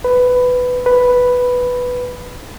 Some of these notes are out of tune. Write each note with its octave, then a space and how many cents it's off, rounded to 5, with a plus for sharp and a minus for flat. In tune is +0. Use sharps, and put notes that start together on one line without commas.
B4 +10
B4 +0